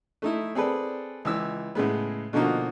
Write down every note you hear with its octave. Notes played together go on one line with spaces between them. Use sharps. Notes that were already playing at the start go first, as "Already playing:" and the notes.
A3 D#4 E4
C4 G#4 A4 B4 D5
C#2 E3 E6
A2 C#3 G#3 B3
B2 D3 F3 A#3 D#4 F#4